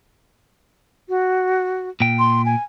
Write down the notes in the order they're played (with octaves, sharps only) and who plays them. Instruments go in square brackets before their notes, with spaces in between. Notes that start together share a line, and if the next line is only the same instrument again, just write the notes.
[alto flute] F#4
[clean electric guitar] A#2 G5
[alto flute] C6
G#5